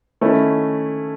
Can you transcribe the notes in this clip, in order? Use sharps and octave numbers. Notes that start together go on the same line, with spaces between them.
D#3 A3 C#4 E4